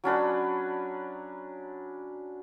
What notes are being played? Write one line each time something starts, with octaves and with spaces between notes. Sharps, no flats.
F#3 C#4 D4 B4